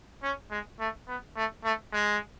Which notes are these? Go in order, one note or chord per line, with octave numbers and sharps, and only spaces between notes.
C#4
G#3
A3
B3
A3
A3
G#3